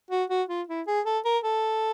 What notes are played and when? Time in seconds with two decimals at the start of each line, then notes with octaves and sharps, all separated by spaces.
0.11 F#4
0.30 F#4
0.49 F4
0.68 E4
0.87 G#4
1.06 A4
1.25 A#4
1.44 A4